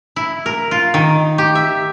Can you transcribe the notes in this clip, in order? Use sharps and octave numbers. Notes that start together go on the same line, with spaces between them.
E4
A#4
F4
D#3
G4
E5